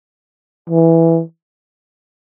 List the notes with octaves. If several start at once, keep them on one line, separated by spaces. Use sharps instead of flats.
E3